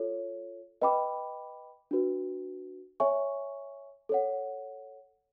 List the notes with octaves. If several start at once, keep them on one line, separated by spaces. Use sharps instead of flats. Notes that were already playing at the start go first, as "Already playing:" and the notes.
Already playing: F4 A4 C#5
B4 D#5 G5 B5 D6
D4 F#4 B4
C#5 E5 G#5 C#6
A4 C#5 F#5